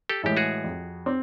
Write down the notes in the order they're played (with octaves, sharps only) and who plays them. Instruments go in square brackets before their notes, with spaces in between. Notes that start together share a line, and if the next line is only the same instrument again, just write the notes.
[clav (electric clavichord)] G4 A4
[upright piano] A2 E3 G#3 [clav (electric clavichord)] G4
[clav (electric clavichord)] F#4 G#4
[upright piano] F2
C4